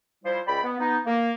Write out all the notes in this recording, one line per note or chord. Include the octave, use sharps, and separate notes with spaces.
F3 G3 E4 C5
C#2 D5 G5 B5
B3
B3 D#4
A#3